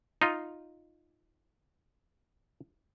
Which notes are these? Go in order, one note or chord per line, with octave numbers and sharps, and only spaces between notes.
D#4 F4